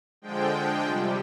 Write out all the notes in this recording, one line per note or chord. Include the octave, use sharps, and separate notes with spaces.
D3 F3 G#3 G5
C3 G3